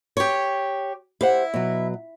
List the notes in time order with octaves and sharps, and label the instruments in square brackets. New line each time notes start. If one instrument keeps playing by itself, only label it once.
[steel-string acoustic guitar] G4 C#5
[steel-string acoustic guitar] E4 [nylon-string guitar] G4 C5 F#5
[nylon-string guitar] B2 F#3